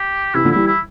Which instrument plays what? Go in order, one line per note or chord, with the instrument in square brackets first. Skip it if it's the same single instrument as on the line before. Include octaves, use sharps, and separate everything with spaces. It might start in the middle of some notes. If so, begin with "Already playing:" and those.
Already playing: [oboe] G4
[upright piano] C3 E3 [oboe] E4
[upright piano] D3 F3
[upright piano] E3 G3 [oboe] E4
[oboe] E4